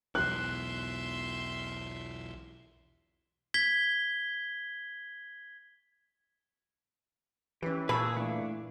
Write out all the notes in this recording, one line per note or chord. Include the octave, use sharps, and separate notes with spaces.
B1 E2 E5 C6 F#6
G#6 B6 G7
E3 C#4 G4 B4
A#2 G#4 B4 A5 C#6 E6
E3 A3 D4